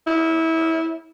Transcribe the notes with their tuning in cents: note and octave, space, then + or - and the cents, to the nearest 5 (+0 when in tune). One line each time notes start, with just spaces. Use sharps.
E4 -25